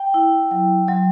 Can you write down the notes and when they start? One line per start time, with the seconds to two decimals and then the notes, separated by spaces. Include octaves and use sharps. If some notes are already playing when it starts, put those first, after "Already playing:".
Already playing: G5
0.14 E4
0.51 F#3
0.88 F#3